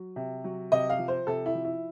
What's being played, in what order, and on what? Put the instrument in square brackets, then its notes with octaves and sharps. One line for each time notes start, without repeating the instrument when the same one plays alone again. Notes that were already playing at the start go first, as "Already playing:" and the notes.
Already playing: [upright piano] F#3
C3
F#3
C3 D#5
F5
F3
C5
C3 A4
E4
F3
E4